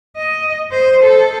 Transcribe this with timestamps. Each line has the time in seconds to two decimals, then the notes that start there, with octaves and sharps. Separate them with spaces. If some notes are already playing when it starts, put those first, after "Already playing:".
0.16 D#5
0.72 C5
1.03 A4